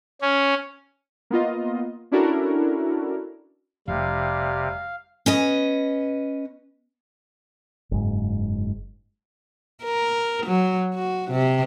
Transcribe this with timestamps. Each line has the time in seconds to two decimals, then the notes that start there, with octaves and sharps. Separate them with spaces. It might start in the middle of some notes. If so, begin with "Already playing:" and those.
0.22 C#4
1.30 A#3 B3 F4 D#5
2.11 C#4 D4 E4 F#4 A4 A#4
3.88 F1 C3 G3 F5
5.26 C#4 B4 D#5
7.91 F#1 G#2
9.84 A#4
10.46 F#3
10.95 F#4
11.31 C3